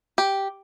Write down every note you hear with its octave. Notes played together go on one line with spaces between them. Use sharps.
G4